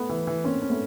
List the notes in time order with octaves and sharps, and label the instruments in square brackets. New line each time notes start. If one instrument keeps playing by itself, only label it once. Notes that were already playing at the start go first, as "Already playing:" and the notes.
Already playing: [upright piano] A3 B3
[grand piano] E3
E3
[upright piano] A#3 C4 [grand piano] C#4
[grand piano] C#4
[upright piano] A3 B3